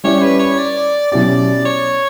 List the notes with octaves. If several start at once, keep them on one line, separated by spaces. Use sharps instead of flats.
G3 C#4 E4 G4 C#5 D5
B4
C#5
D5
B2 F#3 C#4 E4 G4 D5
C#5